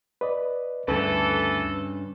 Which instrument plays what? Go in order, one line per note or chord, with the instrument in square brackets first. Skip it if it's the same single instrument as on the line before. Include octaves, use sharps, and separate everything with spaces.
[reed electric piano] B4 D5 D#5
[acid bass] D2 [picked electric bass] G2 C#3 [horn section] E3 A4 [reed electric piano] B4